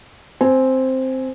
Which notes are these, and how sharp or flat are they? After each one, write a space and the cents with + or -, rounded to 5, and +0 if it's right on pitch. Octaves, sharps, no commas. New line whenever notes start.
C4 +0 G#5 +0